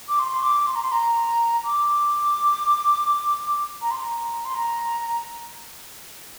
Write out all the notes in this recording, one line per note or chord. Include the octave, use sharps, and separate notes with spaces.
D6
C6
C6
D6
C6
A#5
C6
A#5
D6
A#5
C6
A#5
C6
A#5